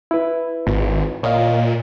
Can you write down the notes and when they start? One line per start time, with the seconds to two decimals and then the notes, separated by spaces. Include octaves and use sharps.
0.11 E4 B4
0.67 G#1
1.23 A#2 C#5 D#5 F5